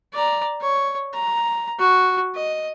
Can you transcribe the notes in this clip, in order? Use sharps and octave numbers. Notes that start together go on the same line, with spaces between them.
D5 A#5
C#5
A#5
F#4
D#5